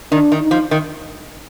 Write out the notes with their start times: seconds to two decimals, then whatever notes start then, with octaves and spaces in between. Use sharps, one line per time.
0.12 D#3 D4
0.32 D#3
0.41 D#4
0.51 F3
0.71 D#3